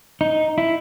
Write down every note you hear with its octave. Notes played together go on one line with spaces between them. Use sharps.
D#4
E4